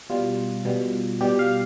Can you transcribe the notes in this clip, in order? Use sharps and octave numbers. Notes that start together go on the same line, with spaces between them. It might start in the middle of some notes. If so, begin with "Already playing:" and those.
B2 G3 F4
B2 G3
B2 G3 G4
F5